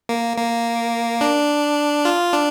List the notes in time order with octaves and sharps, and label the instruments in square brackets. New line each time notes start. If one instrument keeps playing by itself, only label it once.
[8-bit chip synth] A#3
A#3
D4
F4
D4